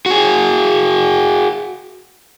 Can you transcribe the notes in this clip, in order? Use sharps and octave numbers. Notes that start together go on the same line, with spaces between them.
F#4 G#4